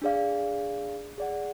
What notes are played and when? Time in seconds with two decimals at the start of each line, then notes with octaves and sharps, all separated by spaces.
0.02 D4 G#4 D5 F5
1.18 G#4 D5 F#5